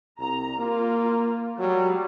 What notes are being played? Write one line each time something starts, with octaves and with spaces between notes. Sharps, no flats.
C2 A#5
A#3 F4
F#3 G3